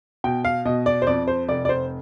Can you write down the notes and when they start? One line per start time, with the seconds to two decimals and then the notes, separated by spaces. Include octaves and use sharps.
0.24 B2 G5
0.45 F5
0.65 B2 D#5
0.86 D5
1.02 C5
1.07 F2 D5
1.28 C5
1.48 F1 D5
1.65 D5
1.69 C5